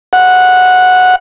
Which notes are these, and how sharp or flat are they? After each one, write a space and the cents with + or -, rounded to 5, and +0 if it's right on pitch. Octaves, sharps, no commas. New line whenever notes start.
F#5 -10